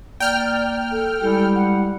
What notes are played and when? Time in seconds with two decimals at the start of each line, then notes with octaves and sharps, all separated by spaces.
0.20 A#3 D5 G5 F6
0.91 A4
1.21 G3 G#3 E4 G4 A4
1.55 F#5